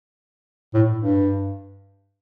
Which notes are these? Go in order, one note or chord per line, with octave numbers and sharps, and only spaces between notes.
A2
G2